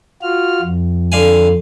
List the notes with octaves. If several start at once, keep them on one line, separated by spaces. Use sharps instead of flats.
F4 F#4 F6
F2
D3 F5 G#5